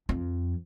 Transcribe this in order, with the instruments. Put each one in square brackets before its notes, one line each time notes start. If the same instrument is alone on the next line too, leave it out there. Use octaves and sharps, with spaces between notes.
[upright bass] F2